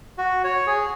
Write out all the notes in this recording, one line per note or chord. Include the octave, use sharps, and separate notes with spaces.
F#4
C#5
G#4